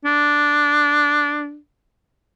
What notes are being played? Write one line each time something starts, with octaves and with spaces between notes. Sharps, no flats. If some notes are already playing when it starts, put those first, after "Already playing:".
D4